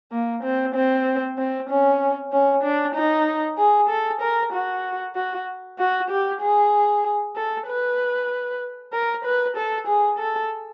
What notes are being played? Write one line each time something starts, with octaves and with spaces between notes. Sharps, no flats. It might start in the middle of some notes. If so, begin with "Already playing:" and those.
A#3
C4
C4
C4
C#4
C#4
D4
D#4
G#4
A4
A#4
F#4
F#4
F#4
G4
G#4
A4
B4
A#4
B4
A4
G#4
A4